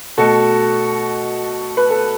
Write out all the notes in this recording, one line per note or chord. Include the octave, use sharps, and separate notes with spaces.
B2 A3 F#4 A4
B4
A4